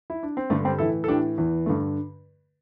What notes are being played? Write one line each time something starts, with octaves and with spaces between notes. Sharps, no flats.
E4
D4
C4
G2 D3 A3
G3 C4
A2 E3 E4 A4
A4
A2 E3 D4 G4
E2 E3
G2 D3 A3